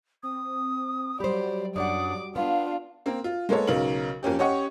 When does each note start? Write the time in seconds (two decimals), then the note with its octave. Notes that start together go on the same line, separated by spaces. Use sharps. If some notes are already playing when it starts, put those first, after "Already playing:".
0.23 C4 D#6
1.20 F#3 G3 G4 C5 D5 B5
1.76 F#2 D4 D5 F#5 D6 D#6
2.36 B3 D4 F4 F5
3.06 A#3 C4 A#4
3.24 F4
3.49 G#3 A#3 B3 A4 C#5
3.67 B1 C#3 D#4 A#4 F5 F#7
4.23 F2 A#3 C#4 G4
4.39 C#4 G4 C#5 D#5 F#5 C#6